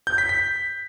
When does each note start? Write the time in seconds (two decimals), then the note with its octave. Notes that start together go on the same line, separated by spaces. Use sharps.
0.07 G6
0.18 B6
0.29 B6